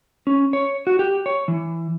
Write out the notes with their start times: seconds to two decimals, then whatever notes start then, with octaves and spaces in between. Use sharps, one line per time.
0.27 C#4
0.53 C#5
0.87 F#4
0.99 G4
1.26 C#5
1.48 E3